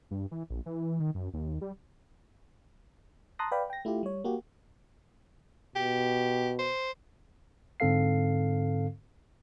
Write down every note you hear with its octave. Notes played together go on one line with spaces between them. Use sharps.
G2
E3
A#1
E3
D#3
F#2
D#2
G3
A5 A#5 C6 D#6 F#6 A#6
B4 D5 F5 G5 B5
G5 A#6
A3 E4 F4 G4
G3 C#5
A#3 F#4 G4
B2 G4
C5
G#2 D3 C4 A4 F5 C7